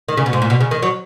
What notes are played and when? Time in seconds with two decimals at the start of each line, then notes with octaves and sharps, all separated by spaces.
0.09 D#3
0.17 C#3
0.26 B2
0.33 G#2
0.42 A#2
0.50 B2
0.61 C#3
0.71 D#3
0.82 F#3